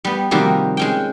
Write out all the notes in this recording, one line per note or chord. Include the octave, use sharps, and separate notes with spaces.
G3 B3
C3 D#3 F3 G3 A#3 F#4
G#3 C#4 G5